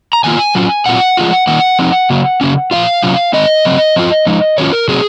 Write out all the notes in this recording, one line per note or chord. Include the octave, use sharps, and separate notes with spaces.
A#5
D#3 A#3 F4 G#5
F#3 C#4 F4
A#2 F#3 C4 F4 F#5
F3 G#3 C#4 F4
D#3 A#3 D#4 F#5
F3 C4 D#4
C#3 F#3 A#3
C#3 F#3 A#3 C#4
A#2 F3 C4 F4 F5
C3 F#3 C#4 F4
D#3 G#3 C4 D#5
C#3 F#3 C4
F3 C4 F4
F3 G#3 D#4
D#3 F#3 C#4 F4 C#5
A#4
C3 F#3 C4 G#4